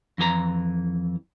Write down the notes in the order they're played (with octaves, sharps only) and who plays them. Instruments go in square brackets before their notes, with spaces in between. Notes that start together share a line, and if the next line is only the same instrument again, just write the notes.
[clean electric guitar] F2 E3 G4 A#5